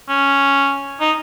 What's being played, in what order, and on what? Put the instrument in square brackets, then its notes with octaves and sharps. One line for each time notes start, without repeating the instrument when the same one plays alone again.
[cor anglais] C#4
D#4